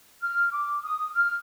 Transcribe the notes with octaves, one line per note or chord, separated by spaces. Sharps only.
F6
D6
D#6
F6